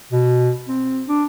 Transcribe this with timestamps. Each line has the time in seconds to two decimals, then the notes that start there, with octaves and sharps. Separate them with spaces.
0.12 B2
0.68 C4
1.08 D4